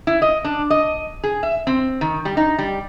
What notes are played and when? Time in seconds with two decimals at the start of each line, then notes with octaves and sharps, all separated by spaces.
0.07 E4
0.22 D#5
0.44 D4
0.70 D#5
1.23 G#4
1.43 E5
1.67 C4
2.01 D#3
2.25 G3
2.37 D#4
2.58 G3